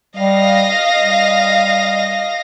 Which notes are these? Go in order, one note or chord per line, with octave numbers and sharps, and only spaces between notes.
G3 D#5 F5 A#6
G3